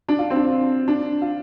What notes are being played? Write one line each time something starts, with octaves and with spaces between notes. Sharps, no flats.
D4
F4
C4
D4
D4
F4